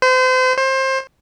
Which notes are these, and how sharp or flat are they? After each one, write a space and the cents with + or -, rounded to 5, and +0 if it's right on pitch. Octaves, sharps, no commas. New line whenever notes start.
C5 -35
C5 +25